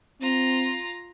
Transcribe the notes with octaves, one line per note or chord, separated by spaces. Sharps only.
C4 F4 A#5